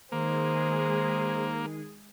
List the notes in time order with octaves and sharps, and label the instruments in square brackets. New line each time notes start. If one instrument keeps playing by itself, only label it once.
[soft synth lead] D#3 [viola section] G#3 G#4 [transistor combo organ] A#3 [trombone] C5